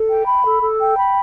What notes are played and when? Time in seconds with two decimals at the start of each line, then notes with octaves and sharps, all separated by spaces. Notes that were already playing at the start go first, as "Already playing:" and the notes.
Already playing: A4
0.09 G5
0.26 B5
0.44 A4
0.62 A4
0.81 G5
0.99 B5